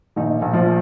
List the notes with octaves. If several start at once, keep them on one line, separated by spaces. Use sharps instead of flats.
A#1 D#3 D#4
A#1
F3 F4